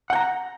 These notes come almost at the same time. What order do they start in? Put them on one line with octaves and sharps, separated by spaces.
F#5 G5 A#5